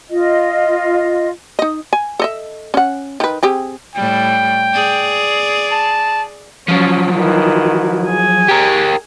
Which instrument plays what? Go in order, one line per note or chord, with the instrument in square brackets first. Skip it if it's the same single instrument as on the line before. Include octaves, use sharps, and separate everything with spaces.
[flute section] F4 D#5
[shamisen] D#4 D#5
G#5
A4 D#5 E5
C#4 F#5
D#3 B4
C4 G4 G#4
[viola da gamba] A2 G3 [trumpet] G5
[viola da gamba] G#4 D5
[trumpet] A5
[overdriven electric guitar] F3 F#3 [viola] C#4
[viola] D#3 E3
G#4 G#5
[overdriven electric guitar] G4 A#4